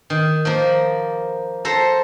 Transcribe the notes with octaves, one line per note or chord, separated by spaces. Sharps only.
D#3
F3 A#3
A4 C5 A#5